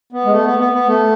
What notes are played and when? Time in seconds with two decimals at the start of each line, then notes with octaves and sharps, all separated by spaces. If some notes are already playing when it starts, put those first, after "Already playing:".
0.12 B3
0.25 G#3
0.30 A3
0.45 B3
0.59 B3
0.73 B3
0.87 A3